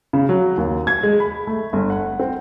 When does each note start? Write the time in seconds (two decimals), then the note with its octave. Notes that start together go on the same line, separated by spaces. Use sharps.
0.13 C#3
0.29 F#3
0.57 D#2
0.87 G#6
1.03 G#3
1.20 B5
1.47 A3
1.73 G1
1.90 F#5
2.19 C4